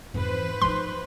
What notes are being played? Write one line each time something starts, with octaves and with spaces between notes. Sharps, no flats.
F2 G#2 E3 B4 C5
F3 D#4 C6